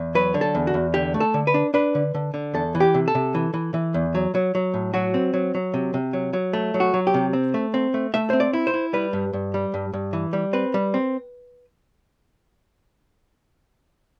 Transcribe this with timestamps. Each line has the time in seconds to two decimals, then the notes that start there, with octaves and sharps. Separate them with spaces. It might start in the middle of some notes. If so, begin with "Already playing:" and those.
Already playing: E2
0.15 F#3 B4
0.34 D3
0.41 A4
0.55 E2
0.67 F#4
0.74 E2
0.94 D3 G4
1.14 A3
1.20 A4
1.34 D3
1.47 B4
1.54 D4
1.74 D4 B4
1.95 D3
2.14 D3
2.34 D3
2.54 E2 A4
2.75 E3
2.80 G4
2.94 C3
3.08 A4
3.15 C3
3.35 E3
3.54 E3
3.74 E3
3.94 E2
4.15 F#3
4.35 F#3
4.55 F#3
4.74 A2
4.94 F#3 F#4
5.14 C4
5.34 F#3
5.55 F#3
5.74 C3
5.94 C3
6.13 F#3
6.33 F#3
6.53 A3
6.74 F#3
6.80 F#4
6.94 F#3
7.07 G4
7.14 C3
7.33 C4
7.54 A3
7.74 C4
7.94 A3
8.14 A3 E5
8.30 C4 C5
8.40 D5
8.53 E4
8.67 C5
8.74 E4
8.93 G3 B4
9.13 G2
9.33 G2
9.54 G3
9.74 G2
9.93 G2
10.13 E3
10.33 G3
10.53 C4 B4
10.74 G3
10.94 C4